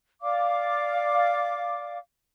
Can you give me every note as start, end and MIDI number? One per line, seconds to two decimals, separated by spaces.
0.22 1.97 74
0.22 1.97 77
0.22 1.97 86